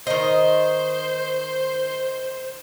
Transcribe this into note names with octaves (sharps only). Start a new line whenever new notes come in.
D#3 C5 D#5